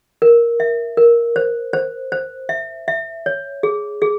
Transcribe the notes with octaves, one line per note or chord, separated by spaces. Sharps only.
A#4
E5
A#4
C5
C5
C5
E5
E5
C#5
G#4
G#4